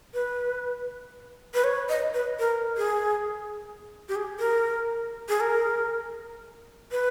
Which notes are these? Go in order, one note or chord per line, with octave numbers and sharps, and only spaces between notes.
B4
B4
C#5
D#5
B4
A#4
G#4
G4
G#4
A#4
G#4
A#4
B4